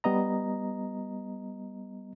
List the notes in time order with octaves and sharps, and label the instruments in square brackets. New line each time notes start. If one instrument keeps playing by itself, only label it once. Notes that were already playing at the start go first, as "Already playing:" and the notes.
[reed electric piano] G3 B3 D#5 A#5